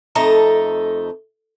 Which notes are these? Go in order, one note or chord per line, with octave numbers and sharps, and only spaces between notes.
F2 A3 D#4 A4 A#5